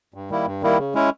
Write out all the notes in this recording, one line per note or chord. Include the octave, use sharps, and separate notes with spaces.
G2
D#3 G3 A#3 E4
G2
D#3 G3 A#3 E4
C#3
G#3 C#4 E4